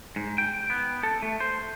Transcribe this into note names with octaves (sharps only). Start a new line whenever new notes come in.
G#2
G5
B3
A4
A3
C5